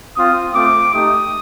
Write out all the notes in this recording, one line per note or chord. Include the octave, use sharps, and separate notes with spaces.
C4 F4 D#6
A3 C4 F4 D6
A3 D#4 G4 D#6